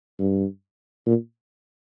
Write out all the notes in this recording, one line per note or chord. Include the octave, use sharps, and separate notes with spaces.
G2
A#2